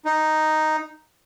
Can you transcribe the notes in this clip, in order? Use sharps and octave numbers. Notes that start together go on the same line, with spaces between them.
D#4